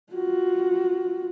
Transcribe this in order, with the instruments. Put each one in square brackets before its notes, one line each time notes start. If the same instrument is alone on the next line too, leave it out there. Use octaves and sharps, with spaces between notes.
[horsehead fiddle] F4 F#4